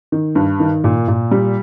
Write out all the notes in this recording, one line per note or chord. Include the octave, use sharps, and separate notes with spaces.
D#3
G2
D#3
A#2
A#2
G3